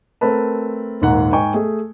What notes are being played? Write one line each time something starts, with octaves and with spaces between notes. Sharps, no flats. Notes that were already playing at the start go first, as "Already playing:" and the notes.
A3 C4 A#4 B4 A5
D#1 D#2 G#2 F#5
G#2 G5 G#5 C#6
A3 G#4